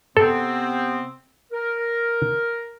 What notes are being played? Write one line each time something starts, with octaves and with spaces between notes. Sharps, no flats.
C3 B3 C4 A4
A#4